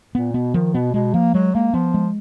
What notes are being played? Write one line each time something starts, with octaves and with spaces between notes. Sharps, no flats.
A#2 B3
B2 B3
D#3 F3
B2 B3
B2 G#3
F3 A#3
F#3 G#3
G#3 A#3
F3 B3
G#3